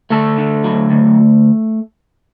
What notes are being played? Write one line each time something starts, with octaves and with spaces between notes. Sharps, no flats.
D2 A3 A4
D3
F#3
D2